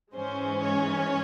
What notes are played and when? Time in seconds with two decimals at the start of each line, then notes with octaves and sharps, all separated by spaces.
0.14 G#2 E3 G#3 C#4 C5
0.63 C#5